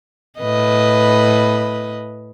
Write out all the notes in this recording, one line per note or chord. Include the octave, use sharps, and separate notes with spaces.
A2 B4 D#5